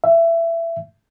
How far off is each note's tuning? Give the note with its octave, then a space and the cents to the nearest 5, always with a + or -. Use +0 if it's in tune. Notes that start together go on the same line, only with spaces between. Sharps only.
E5 +20